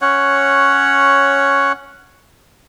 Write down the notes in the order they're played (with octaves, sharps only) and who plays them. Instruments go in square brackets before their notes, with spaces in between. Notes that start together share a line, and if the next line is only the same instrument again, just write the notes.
[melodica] C#4 C#5 F#5